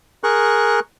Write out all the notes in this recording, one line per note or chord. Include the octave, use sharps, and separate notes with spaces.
G#4 A#4 C#6 F#6